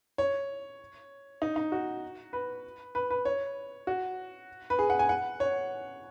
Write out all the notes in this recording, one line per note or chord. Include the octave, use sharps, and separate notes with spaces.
C#5
D#4
D#4
F#4
B4
B4
B4
C#5
F#4
B4
G#4
F#5
G#5
F#5
C#5